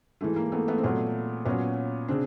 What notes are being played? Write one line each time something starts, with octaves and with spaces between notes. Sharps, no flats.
G#2 E3 A3
A#3
A3 B3
A3 B3
C4
A#2 F#3 A3 B3
A#2 F#3 B3 C#4
C#3 C4 D4